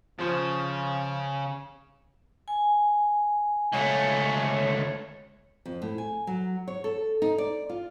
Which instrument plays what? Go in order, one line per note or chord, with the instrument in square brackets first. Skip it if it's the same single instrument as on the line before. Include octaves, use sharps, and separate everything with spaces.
[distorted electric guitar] C#3 [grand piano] F3 C5
[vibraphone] G#5
[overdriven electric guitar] C#2 A3 [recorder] C#5
[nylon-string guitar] F2
A2
G#5
F#3
C#5
A4
D#4
D5
F4